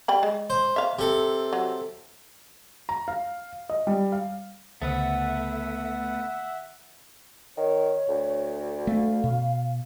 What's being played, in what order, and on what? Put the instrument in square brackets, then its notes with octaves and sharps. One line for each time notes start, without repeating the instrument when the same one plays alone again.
[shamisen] G3 G5 B5
G#3
[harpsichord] C5
[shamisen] E5 F5
[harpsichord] C3 A4
[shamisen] F#3
[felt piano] A#5
F5
D#5
G3
F5
[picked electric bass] C#2 [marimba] D3 [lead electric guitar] A3 B3 [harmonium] E5 F#5
[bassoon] D#3 [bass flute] C#5
[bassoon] D2
[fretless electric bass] A3 [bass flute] F5
[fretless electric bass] B2